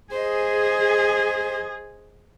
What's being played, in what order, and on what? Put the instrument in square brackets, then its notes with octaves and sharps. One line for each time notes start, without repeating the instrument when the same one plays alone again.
[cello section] G#4 [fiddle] C5 D#5